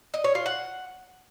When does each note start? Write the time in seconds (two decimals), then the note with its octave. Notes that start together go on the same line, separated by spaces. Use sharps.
0.14 D#5
0.24 C#5
0.35 F4
0.46 F#5